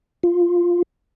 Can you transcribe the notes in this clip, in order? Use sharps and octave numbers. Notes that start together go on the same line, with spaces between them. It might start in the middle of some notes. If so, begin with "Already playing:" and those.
F4